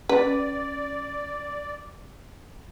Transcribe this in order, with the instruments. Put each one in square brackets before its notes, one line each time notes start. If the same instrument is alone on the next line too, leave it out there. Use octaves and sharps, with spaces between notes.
[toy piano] C#4 G4 D#5 [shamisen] B4 [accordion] D5